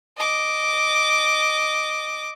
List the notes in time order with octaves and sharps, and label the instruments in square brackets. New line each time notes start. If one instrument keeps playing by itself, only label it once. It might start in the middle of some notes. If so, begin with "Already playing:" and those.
[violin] D#5 D6